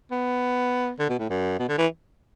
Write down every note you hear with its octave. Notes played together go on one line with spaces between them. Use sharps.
B3
D3
B2
A2
F#2
B2
D3
E3